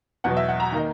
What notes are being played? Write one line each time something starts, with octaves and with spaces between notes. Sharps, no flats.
E2 B2 F#3 F#5
E5
F#5
A#5
D#3 A#3 D#4